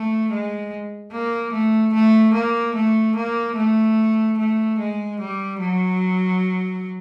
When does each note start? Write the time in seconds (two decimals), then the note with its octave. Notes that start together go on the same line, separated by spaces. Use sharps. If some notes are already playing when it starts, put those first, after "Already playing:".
Already playing: A3
0.31 G#3
1.12 A#3
1.53 A3
1.94 A3
2.34 A#3
2.75 A3
3.16 A#3
3.57 A3
4.38 A3
4.79 G#3
5.20 G3
5.60 F#3